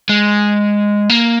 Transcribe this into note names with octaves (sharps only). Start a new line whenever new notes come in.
G#3
A#3